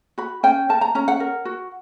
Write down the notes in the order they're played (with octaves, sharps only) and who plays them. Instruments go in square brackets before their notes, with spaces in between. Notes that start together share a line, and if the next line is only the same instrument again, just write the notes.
[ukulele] F#4 B5
C#4 G5
A#4 A5
A#5
C#4 A#5
F#5
A#4
F#4